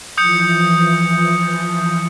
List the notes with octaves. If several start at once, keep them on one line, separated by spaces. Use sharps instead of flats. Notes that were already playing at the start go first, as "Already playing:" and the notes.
E3 F3 D#6 G6 C#7